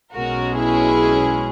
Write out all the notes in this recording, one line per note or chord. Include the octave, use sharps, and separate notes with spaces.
B1 B2 G#3 C#4 F#4 A#4
E4 G#4